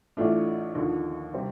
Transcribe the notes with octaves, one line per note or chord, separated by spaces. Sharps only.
A1 A2 A3 D4 F4
D#2 D3 F3
C3 G3 C4 G4 C5